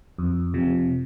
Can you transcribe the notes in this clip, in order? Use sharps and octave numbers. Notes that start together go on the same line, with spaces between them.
F2
C3 F3